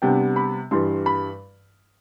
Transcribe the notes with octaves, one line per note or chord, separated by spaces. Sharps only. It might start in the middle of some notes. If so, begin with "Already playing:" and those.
C3 G3 B3 D4 G5
B5
G2 E3 G3 C6
B5